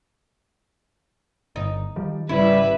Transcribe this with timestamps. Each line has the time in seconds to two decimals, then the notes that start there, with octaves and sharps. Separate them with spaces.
1.56 G1 D#4
1.96 D#3 F3 G3
2.29 G#1 C#3 G3 C#4 E4 B4 E5